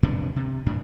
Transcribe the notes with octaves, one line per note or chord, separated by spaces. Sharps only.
F2 C3 B3 D4
C3
F#2 A2 D4